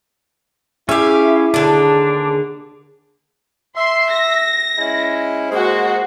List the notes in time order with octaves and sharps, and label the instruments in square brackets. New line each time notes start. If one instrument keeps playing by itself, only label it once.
[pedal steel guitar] C#4 G4 [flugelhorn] E4 [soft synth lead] G#4 [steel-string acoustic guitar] E5 F5
[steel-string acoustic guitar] D#2 D3 [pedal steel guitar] D4
[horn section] E5 [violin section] C6
[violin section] A#6
[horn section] G#3 C#4 E4
[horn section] G#3 A#3 [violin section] F#4 C5